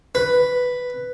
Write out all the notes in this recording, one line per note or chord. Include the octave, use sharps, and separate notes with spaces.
B4